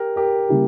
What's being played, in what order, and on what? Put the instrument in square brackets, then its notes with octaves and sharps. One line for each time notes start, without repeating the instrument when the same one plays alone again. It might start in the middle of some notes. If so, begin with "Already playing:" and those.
Already playing: [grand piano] G4 A#4
G4 A#4
[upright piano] C#3 G3 A#3 E4